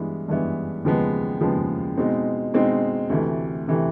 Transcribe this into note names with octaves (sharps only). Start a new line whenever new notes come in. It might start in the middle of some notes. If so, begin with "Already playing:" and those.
Already playing: G2 E3 G#3 B3 E4
G2 E3 G#3 B3 E4
D#2 C#3 F3 G#3 B3
D#2 C#3 F3 G#3 B3
B2 G#3 C4 D#4
B2 G#3 C4 D#4
D2 C3 E3 A3
C3 E3 A3